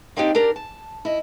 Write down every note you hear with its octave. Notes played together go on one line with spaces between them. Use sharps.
A#3 C4 D4 D#4 G4
D4 G4 A#4 D5
A5
E4 D#5